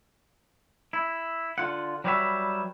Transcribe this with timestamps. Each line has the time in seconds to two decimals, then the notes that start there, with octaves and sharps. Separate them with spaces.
0.93 E4
1.58 D3 F4 F#5
2.04 F#3 G3 B4 C#5 D5 E5